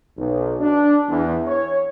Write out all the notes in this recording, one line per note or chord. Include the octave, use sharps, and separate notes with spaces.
B1
D4
E2
C#5